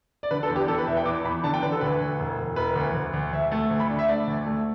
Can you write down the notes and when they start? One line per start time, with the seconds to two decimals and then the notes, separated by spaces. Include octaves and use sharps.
0.23 D5
0.31 D3 B4
0.43 A4
0.50 E2
0.56 G4
0.68 E2 A4
0.78 B4
0.87 E2 E5
0.97 G5
1.05 E2 D6
1.24 E2 B5
1.43 D3 A5
1.54 G5
1.62 D3 B4
1.72 A4
1.81 D2 B4
2.00 D2
2.20 E1
2.38 E1
2.56 E1 B4
2.75 D2
2.94 D2
3.13 D2
3.33 D2 E5
3.51 A3
3.70 D2
3.80 B5
3.89 D4
3.99 E5
4.09 A3 D5
4.27 D2
4.46 A3